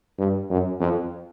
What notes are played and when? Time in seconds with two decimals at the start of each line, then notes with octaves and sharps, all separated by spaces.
0.19 G2
0.50 F#2
0.80 F2